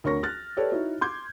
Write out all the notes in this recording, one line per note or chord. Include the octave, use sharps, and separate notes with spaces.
D2 A#4 C#5 C#6 A#6
F6 F#6 A6
G4 A4 B4 C#5 D5
D#4 E4 F#4 C#5
C6 D6 G6 G#6